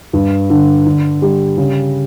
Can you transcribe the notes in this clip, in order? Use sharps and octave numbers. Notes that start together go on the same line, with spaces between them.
G2
D3
D3
G3
C#3